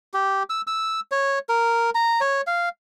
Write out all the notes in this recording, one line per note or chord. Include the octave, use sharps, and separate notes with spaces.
G4
E6
E6
C#5
A#4
A#5
C#5
F5